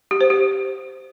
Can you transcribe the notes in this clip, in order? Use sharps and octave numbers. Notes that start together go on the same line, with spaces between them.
G4
C5
G4